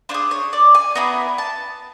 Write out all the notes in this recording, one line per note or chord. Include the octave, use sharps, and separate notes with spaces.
D4 F4 C5
G#4
C#5
D5
G#5
B3 E4 G#4 A#5
A5